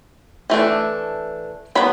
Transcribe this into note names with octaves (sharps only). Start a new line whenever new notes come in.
E3 A3 D4
F#3 B3 B5